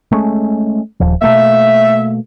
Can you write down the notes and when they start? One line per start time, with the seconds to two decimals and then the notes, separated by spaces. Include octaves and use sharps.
0.12 G#3 A3 C#4
1.00 D#1 F3
1.22 B2 A3 A#3 E5